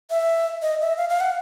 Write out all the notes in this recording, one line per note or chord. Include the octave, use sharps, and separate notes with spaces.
E5
D#5
E5
F5
F5
F#5